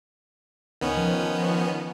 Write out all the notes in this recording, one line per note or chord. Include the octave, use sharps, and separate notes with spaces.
C#2 D#3 B3 C#4
F3